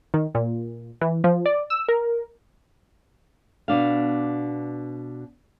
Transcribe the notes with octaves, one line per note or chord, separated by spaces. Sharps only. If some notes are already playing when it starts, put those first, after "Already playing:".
D#3
A#2
E3
F3
D5
E6
A#4
B2 D4 F5